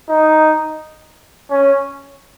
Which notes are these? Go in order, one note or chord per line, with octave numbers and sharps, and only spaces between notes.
D#4
C#4